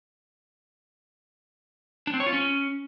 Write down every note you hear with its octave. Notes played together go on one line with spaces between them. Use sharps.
D4
C4
C#5
F4
C#4